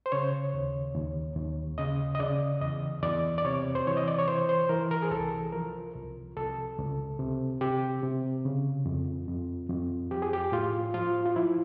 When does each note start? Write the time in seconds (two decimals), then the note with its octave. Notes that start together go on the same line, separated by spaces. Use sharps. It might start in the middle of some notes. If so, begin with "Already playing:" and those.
0.06 C5
0.12 C#3 C#5
0.54 D#2
0.95 D#2
1.36 D#2
1.78 C#3 D#5
2.15 D#5
2.19 C#3 D5
2.61 E2 D#5
3.03 E2 D5
3.38 D5
3.45 C3 C#5
3.75 C5
3.87 E3 C#5
3.97 D#5
4.08 D5
4.19 C#5
4.28 E3 C5
4.49 C5
4.69 E3 A#4
4.91 A#4
5.02 G#4
5.11 C2 A4
5.52 F3 A#4
5.95 C2
6.36 C2 A4
6.79 C#2
7.19 C3
7.61 C3 G4
8.03 C3
8.45 C#3
8.86 F2
9.28 F2
9.70 F2
10.11 F3 G4
10.22 G#4
10.33 G4
10.52 A2 F4
10.94 F3 F4
11.26 F4
11.36 F3 E4